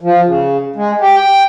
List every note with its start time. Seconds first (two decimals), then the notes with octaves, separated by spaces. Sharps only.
0.01 F3
0.26 C#3
0.76 G#3
1.00 G4
1.16 G5